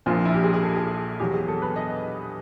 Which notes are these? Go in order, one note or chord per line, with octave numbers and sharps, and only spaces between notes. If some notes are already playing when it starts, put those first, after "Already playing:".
A#1 A#2 F3 F4
E4
G4
G#4
G#4
A4
G#4
E2 B2 F#3 G4
G#4
A4
B4
D#5